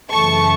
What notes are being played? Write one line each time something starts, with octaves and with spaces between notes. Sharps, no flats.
F#2 C#3 E3 A3 A5 C#6